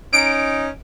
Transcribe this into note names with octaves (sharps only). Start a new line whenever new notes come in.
C#4 D#4 D7